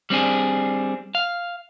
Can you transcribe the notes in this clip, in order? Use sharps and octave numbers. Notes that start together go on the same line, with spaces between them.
G3 C4 D4 G#4
F5